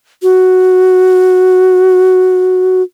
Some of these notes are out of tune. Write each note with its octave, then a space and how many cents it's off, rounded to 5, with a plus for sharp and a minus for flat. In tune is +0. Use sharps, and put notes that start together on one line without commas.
F#4 +0